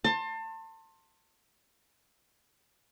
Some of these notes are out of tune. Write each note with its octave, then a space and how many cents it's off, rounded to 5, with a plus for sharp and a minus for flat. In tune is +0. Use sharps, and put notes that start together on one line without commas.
A5 +30 C6 +25